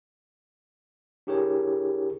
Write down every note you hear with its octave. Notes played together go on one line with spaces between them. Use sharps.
D4 E4 G4 G#4 A#4 C#5